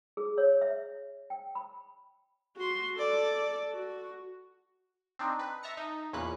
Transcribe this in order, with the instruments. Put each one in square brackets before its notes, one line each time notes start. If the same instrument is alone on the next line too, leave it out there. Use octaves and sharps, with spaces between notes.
[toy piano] G#4
C#5
E5
G5
B5
[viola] F#4 C6
A4 D5
F#4
[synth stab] C4 D4 D#4
B4
E5 A5 A#5 A#6 C#7
D#4
E2 A#2 A#3 C#4 B4 F#6